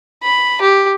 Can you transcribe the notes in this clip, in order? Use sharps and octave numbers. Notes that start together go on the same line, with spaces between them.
B5
G4